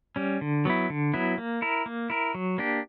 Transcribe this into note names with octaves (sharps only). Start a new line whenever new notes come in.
G3 C#4
D3
F#3 B3 E4
D3
F#3 B3 E4
A#3
E4 A#4
A#3
E4 A#4
F#3
A#3 D4 G4